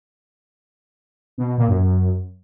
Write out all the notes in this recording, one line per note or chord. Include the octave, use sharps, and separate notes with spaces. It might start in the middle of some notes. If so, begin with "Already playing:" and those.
B2
B2
A#2
F#2